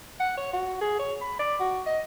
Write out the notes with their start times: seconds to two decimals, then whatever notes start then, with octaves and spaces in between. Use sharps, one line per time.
0.20 F#5
0.37 C#5
0.53 F#4
0.81 G#4
0.99 C#5
1.21 B5
1.39 D5
1.60 F#4
1.86 D#5